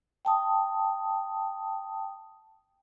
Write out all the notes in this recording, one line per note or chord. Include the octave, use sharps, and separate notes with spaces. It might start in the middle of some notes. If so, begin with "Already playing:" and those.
G5 A5 D#6